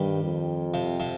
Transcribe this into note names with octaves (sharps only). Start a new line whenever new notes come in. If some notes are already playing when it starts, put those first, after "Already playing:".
Already playing: G2 D#3 G3
F2
C3 F3
C3 F3